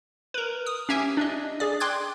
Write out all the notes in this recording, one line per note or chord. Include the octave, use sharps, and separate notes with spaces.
A#4 B4
D#6
C#4 G4 E5 G#5
D4 D#5
G#4 D5
G5 C6 D6 F#6 G#6